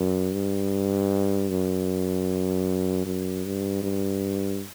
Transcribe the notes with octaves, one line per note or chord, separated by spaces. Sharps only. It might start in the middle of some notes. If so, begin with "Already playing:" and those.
Already playing: F#2
G2
F#2
F#2
G2
G2